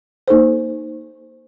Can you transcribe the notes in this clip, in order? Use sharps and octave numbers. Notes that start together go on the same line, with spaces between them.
A#3 D#4 A4 C5